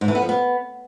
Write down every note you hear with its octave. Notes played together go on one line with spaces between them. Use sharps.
G#2
E3
B3
F3
B3